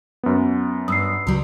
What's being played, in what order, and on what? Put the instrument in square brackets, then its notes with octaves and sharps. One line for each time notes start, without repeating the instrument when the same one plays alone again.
[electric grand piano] F#2 B3
[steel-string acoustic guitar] G2 [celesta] D#6 E6 C7
[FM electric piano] C#2 [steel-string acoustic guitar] F#3 G3